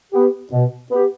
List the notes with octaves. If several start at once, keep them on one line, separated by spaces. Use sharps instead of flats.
B3 G4
B2
B3 G4